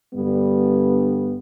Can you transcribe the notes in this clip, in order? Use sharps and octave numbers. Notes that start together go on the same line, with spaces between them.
G2 D3 G3 B3